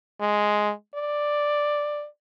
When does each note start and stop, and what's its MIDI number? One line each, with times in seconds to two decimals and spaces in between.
0.21 0.71 56
0.95 2.07 74